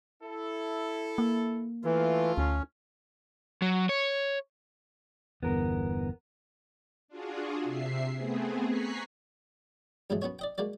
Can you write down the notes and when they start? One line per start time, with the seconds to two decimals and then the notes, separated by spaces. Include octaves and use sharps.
0.23 E4 A4
1.18 A#3
1.85 E3 A3 F4
2.38 D2 C#4
3.62 F#3
3.89 C#5
5.43 G1 E2 B3 A#4
7.08 D4 F4 F#4 G#4
7.63 C3 E5 C7
8.16 A3 B3 C4 G#4
8.66 G#5 A#5 C#6 F#6 B6 C7
10.10 G2 B2 E3 F#3 G#3 A3
10.22 B3 C#4 F#4 C#5
10.39 D5 D#5 G5
10.58 G#3 A#3 F#4 D5